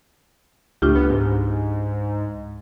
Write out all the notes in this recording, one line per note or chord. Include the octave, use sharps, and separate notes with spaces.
C#2 A2 D4 F4 G4
B3
G#2